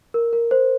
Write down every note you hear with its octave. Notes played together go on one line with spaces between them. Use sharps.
A#4
A#4
C5